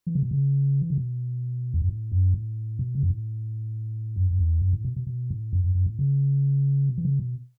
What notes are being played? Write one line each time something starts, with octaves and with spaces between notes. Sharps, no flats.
E3
C#3
B2
C#3
E3
C#3
B2
E2
F#2
A2
F#2
A2
B2
C#3
F#2
A2
F#2
F#2
E2
F#2
A2
B2
B2
B2
A2
F#2
F#2
F#2
A2
C#3
B2
E3
C#3
B2